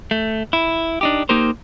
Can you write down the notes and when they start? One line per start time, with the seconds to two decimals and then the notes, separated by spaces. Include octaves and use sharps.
0.11 A3
0.53 E4
1.01 D4 D#4 G4
1.29 A#3 D#4 G4 A#4 C5